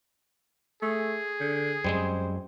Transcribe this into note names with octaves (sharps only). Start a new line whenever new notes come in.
A3 G#4
D3
F#2 G3 G#3 C4 C5